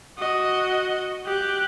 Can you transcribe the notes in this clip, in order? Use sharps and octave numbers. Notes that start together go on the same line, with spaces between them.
F#4 D#5
G4 F#6